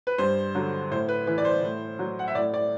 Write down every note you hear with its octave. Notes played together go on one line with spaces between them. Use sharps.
B4
G2 C5
D3 F#3
A2 C5
B4
E3 B4
D5
C5
A2
F#3
F#5
E5
A2 D5
D5